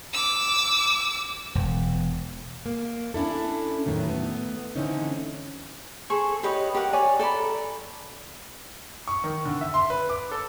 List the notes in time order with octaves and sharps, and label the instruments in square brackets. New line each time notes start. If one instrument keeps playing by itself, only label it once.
[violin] D6 E6
[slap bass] E1
[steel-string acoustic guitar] A#3
C#4 D4 E4 A4
E2 A2 D#3 F#3
A3 B3
D3 E3 C4 C#4 D#4
[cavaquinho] G#4 A4 C5 C#6
G4 B4 C#5 D#5
G4 A#4 F#5
C#5 D5 G#5
A4 D5 A#5 B5
[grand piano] C#6
D#3
D3
E5
C6
B4
D6
A4